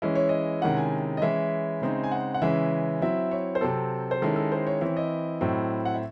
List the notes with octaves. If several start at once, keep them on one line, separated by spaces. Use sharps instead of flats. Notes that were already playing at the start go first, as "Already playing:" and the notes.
E3 G#3 C#4 E4 D#5
C#5
D#5
C3 D#3 G#3 C#4 E4 F#5
G#5
D#5
E3 G#3 C#4 E4 E5
C#3 G#3 C4 D#4
G#5
F#5
F#5
C#3 E3 G#3 C#4 E5
F#3 C4 E4 E5
C#5
C5
C3 F#3 C4 A4
C5
D#3 G#3 C#4 E4 A4
A4
C5
C#5
E3 C4 E4 C#5
D#5
A2 F#3 C4 E4
F#5
E5